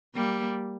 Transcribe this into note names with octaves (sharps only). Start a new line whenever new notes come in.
G3 A#3